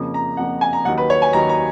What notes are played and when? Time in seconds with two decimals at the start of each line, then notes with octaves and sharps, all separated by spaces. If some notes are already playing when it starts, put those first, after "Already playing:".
Already playing: F2 C#3 F3 A#3
0.14 A#5
0.37 F2 C#3 F3 A#3 F#5
0.61 G#5
0.73 A#5
0.85 D#2 D#3 F#3 F#5
0.98 B4
1.10 C#5
1.22 G#5
1.33 D#2 D#3 F#3 A#5
1.49 A#5